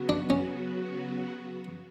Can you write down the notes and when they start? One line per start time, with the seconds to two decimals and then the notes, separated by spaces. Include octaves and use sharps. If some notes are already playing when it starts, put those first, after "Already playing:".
Already playing: C#3 F#3 B3 F#4
0.09 D4
0.30 C#4